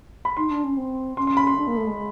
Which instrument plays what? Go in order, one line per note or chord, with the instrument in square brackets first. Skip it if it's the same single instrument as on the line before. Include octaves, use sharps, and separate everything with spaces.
[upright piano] B5
[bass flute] D#4 [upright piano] C6
[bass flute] D4
C#4
C4
[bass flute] C#4 [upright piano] C6
[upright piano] C6
B5
C6
[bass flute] D4
A#3
A3
G#3